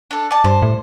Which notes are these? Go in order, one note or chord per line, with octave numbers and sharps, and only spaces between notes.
D4 A4
D5 A5
G2 C5
A2